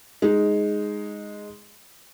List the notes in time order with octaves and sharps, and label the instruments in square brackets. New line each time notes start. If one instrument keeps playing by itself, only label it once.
[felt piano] G#3 D#4